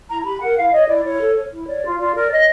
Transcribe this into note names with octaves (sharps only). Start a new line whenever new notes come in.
E4 A#5
A#5
G4 B5
A#4 F#5
E4 F5
C#5 D#5
E4 D5
E4 C#5
A4
C#5
E4
C#5 D5
F4
F4 D5
A#4 D5
C#5 D#5